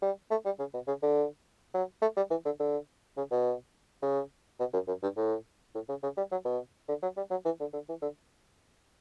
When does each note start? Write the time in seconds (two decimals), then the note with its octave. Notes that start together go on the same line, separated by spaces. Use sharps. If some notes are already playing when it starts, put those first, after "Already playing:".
0.02 G3
0.31 A3
0.45 G3
0.59 C#3
0.74 B2
0.88 C#3
1.03 D3
1.74 F#3
2.02 A3
2.17 G3
2.30 E3
2.45 D3
2.60 D3
3.17 C#3
3.32 B2
4.02 C#3
4.60 B2
4.74 F#2
4.88 F#2
5.03 G2
5.17 A2
5.75 A2
5.89 C#3
6.03 C#3
6.17 G3
6.32 F#3
6.45 B2
6.88 D3
7.03 F#3
7.17 G3
7.31 F#3
7.45 E3
7.60 D3
7.74 D3
7.89 E3
8.02 D3